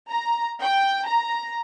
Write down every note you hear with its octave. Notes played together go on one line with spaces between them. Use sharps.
A#5
G5
A#5